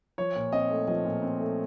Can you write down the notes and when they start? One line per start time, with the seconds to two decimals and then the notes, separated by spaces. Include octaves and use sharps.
0.18 F3 C#5
0.36 A#2
0.52 C4 D#5
0.70 A3
0.87 F3 D#5
1.05 A#2
1.22 C4
1.40 A3